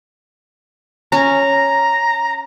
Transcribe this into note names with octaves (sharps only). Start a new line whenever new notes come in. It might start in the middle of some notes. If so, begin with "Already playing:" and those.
C#4 A#5